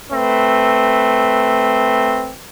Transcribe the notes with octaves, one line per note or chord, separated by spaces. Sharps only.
A3 C4 B4